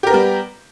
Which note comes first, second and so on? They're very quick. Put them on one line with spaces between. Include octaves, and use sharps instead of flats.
G4 A#4 B3 G3